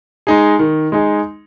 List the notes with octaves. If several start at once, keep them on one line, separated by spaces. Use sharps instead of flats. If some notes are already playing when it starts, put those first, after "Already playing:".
G#3 D#4 G#4
D#3
G#3 D#4 G#4